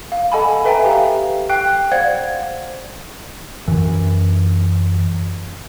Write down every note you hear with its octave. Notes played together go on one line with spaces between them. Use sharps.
F5
A4 D#5 F#5 G#5 A5 B5
A4 B4 E5 G5 G#5 A#5
G4 F5
G5 F#6 C7
C5 D5 F5 F#5 G#6
F#2 E3